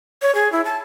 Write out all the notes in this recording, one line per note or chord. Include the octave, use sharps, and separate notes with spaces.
C#5
G#4
E4
A5